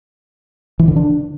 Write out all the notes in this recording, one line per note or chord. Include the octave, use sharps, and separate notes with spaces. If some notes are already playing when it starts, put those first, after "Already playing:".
E3
D3
D4